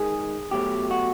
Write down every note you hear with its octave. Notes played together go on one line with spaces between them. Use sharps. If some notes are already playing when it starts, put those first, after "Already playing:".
Already playing: D#3 G#3 G#4
B2 F#3 A3 G4
F#4